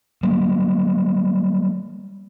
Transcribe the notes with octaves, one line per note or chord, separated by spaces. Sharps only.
F#3 G3 A#3